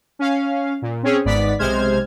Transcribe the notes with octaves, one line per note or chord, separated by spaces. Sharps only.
C#4 F5
A#2
C4 C#4 G#4 C#5
G#1 G#2 B3 D5 B6
B1 C3 G#3 C5 F6 G#6